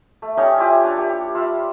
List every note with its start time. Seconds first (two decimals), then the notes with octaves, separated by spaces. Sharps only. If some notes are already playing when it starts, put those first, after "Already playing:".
0.22 A3
0.37 G3 C#4 D#4 C#5
0.58 E4 F4 G4 G#5
0.84 D4 C#5
0.96 A#3 G4
1.35 F4 E5 F5 B5